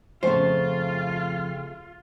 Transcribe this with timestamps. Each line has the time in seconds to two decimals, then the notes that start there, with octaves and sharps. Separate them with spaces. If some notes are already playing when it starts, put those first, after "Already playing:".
0.23 F2 C#3 A3 F4 C5